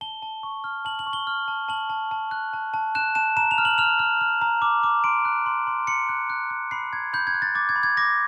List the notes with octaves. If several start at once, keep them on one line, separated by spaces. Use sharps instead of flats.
A5 G7
A5
C#6
F6
A5 F#7
F#7
C#6
G7
F6
A5
A5 F#7
A5
A5
F#6
A5
A5
F#6 E7
A5 E7
A#5 E7
F7
F6
F#7
F6 F7
F6
F6
A#5
D6
D6
C6 D7
F#6
C6
C6
C6 C#7
F#6
F#6
F#6
B5 C7
B5 G#6
B5 G6
G#6
F#6
A6
D6 A6
G#6
B5
G#6
D6 A#6